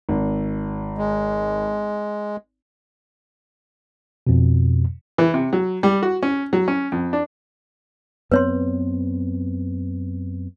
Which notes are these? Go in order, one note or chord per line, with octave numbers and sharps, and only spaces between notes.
G#1
G#3
F2 B2
E3
C3
F#3
G3
F#4
C#4
F#3
C#4
F2
D4
F#2 B3 C4 B4 C#5 C6